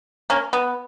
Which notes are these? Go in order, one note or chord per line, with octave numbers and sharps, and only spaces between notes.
A#3 C#4
B3